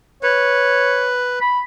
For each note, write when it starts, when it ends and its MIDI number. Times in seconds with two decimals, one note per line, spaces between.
0.23 1.39 71
0.23 1.14 73
1.41 1.60 83